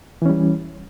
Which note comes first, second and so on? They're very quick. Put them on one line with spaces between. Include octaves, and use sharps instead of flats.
E3 C#4 G3